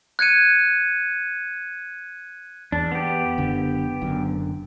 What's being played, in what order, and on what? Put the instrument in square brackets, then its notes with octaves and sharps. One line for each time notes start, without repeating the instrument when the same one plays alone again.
[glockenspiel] F#6 G#6 C#7 D#7
[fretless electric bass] E2 [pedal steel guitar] D4
[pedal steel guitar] B3 G4
[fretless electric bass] F#1 D3
F#1 F#2 D3